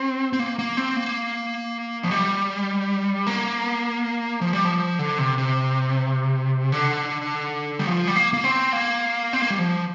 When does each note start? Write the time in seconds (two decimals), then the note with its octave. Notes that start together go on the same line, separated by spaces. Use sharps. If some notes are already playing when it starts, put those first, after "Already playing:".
Already playing: C4
0.33 C4
0.39 A#3
0.59 A#3
0.77 C4
0.96 A#3
2.03 F3
2.11 G3
3.27 A#3
4.41 F3
4.53 G3
4.65 F3
4.99 D3
5.18 C3
5.38 C3
6.72 D3
7.79 G3
7.87 F3
8.07 G3
8.16 A#3
8.34 A#3
8.44 C4
8.73 A#3
9.33 C4
9.42 A#3
9.50 G3
9.59 F3